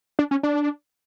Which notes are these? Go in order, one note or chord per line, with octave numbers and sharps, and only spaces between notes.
D4
C#4
D4